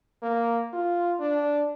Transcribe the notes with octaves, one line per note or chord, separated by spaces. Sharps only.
A#3
F4
D4